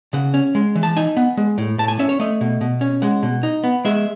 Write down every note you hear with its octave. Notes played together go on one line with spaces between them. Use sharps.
C#3 F#5
C#4
G#3
E3
A5
D#4 G#5
B3
G#3
A2
A2 A5
G#5
C#4 E5
C#5
A3 D#5
B2
B2
C#4
G#3 F#5
B2
D#4
B3
G#3 E5